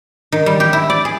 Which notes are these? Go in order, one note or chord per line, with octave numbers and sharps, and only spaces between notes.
D#3
G3
G4
E4
D5
G#4